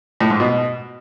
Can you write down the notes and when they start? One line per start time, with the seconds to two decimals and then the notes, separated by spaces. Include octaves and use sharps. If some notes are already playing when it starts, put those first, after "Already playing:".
0.20 A2
0.30 G#2
0.40 B2